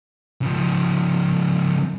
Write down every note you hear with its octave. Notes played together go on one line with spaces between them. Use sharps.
C#3 F3